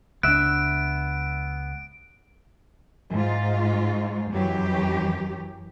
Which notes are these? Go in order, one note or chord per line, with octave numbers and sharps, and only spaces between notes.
C#2 G3 B3 D4 E5 F#6 D7
G#2 F4
F#2 E3 F#3 G4